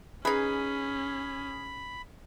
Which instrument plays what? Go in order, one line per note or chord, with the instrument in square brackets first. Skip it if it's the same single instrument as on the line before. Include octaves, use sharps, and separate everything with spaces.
[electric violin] C#4 [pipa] D#4 B4 [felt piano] G#4 [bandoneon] B5